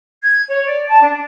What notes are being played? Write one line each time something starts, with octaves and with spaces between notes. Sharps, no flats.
G#6
C#5
D5
A5
D4